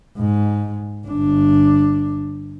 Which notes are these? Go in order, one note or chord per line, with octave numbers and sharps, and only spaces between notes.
G#2
G1 D4